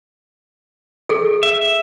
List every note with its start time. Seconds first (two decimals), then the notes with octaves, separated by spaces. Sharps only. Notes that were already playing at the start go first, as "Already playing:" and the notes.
1.09 G#4 A4
1.43 E5